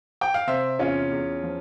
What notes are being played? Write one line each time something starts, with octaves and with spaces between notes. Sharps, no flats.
G5
F5
C3 C5 E5
E2 C#4 F4
E2
F3